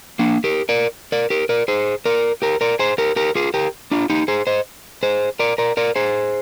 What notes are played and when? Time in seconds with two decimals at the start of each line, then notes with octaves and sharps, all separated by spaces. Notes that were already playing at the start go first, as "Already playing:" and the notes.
0.19 A#3 D4
0.44 G4 A#4
0.69 A#4 D5
1.12 A#4 D5
1.30 G4 A#4
1.49 A#4 D5
1.68 G#4 C5
2.06 A#4 D5
2.42 G4 A#4
2.61 A#4 D5
2.79 G#4 C5
2.98 G4 A#4
3.16 G4 A#4
3.35 F4 G#4
3.54 G4 A#4
3.91 D4 F4
4.10 D#4 G4
4.28 G#4 C5
4.47 C5 D#5
5.03 G#4 C5
5.39 A#4 D5
5.58 A#4 D5
5.77 A#4 D5
5.96 G#4 C5